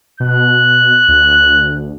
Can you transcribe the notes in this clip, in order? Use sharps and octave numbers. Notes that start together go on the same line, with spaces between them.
B2 F#6
D2